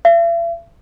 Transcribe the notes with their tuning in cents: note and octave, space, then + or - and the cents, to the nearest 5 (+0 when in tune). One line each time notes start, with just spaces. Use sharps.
E5 +45